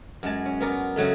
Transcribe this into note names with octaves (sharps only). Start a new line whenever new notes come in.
F#2 G#3 A5
C#4
B3 A#4 D5
C#3 F#3 G#3 A3